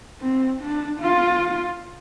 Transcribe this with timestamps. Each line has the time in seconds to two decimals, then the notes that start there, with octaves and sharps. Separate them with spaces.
0.21 C4
0.60 D4
1.01 F4